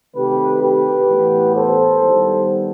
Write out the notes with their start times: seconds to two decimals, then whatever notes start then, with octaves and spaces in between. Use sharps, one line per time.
0.15 C3 D#3 A3 G4 B4
0.62 G4 B4
1.09 A2 E3 B3
1.55 A4 C5
2.02 D#3 G3 B3